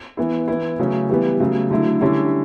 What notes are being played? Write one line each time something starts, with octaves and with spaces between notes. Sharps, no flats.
E3 B3 E4
E3 B3 E4
C#3 F#3 A3 C#4
E3 G3 B3
C#3 F#3 A3
D3 F#3 A3 E4
D3 G3 C#4 E4